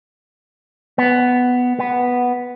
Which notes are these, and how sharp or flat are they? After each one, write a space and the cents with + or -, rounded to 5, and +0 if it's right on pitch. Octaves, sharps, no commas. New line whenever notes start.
B3 +5
B3 -5